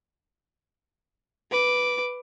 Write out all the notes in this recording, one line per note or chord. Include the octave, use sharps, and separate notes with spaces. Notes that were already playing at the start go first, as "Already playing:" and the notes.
B4 D6